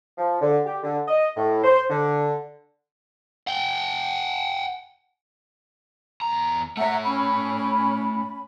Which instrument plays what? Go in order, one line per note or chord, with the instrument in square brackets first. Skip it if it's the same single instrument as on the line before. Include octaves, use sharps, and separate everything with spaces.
[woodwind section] F3
D3
G4
D3
D#5
A2
C5
D3
[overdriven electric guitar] F#5 G5
E2 A#5
[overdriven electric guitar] A3 C#5 [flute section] E5 F#5 A#5
[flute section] C#4 B5